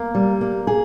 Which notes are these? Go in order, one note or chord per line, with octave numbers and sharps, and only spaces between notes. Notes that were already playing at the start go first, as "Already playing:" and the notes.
Already playing: A#3
G3
A#3
G#4